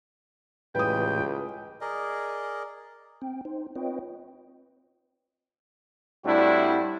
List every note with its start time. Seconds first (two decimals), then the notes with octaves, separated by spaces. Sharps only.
0.75 C#2 A2 E3 G3 B4 G5 D#6
1.81 G#4 A#4 D5 D#5
3.22 C4 G5
3.45 D#4 C5
3.76 C4 F4 B4 C#5 D#5 G5
6.24 A2 G3 C4 D4 E4 F#4